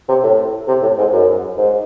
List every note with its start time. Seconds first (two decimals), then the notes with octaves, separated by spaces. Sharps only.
0.09 C3
0.24 A2
0.68 C3
0.83 A2
0.98 G#2
1.13 F#2
1.58 G#2